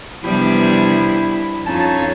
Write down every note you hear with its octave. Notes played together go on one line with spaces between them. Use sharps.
C3 E3 F3 G3 B3 D4 E4
F2 C#4 D#4 C#5 A5